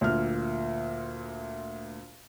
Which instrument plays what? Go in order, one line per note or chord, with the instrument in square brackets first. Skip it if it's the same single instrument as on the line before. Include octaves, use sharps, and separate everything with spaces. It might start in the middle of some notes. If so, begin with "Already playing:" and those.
[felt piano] D2 A#2 F6